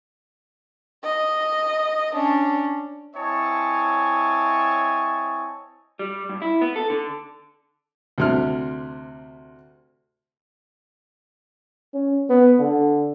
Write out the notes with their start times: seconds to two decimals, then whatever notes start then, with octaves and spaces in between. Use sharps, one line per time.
1.04 D#5
2.15 C#4 D4
3.16 C4 E4 C#5 D#5 G#5 A5
5.99 G3
6.29 G2
6.42 E4
6.61 B3
6.76 A4
6.90 D3
8.18 D2 C3 F6
11.93 C#4
12.29 B3
12.59 D3